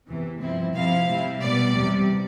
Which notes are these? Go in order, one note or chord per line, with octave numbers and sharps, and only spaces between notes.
E2 C3 E3
G2 F3 C4 E4
C3 F3 C4 E4 F5
C3 G3 C4 E4
B2 G3 B3 D5
E2 C3 G3